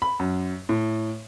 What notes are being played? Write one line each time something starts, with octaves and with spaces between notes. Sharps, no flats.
B5
F#2
A2